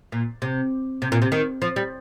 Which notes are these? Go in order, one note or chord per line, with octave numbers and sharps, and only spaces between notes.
A#2
C3
C3
A#2
C3
D#3
F3
G3